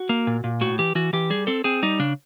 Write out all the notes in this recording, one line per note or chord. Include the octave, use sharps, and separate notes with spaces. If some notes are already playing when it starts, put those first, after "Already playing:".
Already playing: F#4
A#3
A#2
A#2
A2 F#4
E3 G4
E3 F#4
E3 G4
G3 G#4
C4 A4
C4 G#4
G3 D#4
C#3 D4